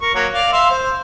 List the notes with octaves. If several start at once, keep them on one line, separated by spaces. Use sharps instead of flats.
A#4 C#6
F#3 A#3 C#5
D5 F5
E5 F5 C6
C5